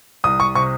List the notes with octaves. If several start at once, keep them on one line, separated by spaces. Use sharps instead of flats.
C2 D#6
C#6
C3 C#6